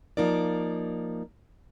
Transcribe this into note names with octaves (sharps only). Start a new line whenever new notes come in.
F3 A#3 D#4 A#4 D5